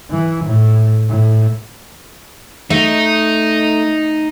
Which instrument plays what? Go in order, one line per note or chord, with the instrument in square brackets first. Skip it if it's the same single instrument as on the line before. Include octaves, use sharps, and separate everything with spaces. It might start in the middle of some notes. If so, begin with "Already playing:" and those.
[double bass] E3
A2
A2
[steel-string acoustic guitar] A3 [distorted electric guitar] D#4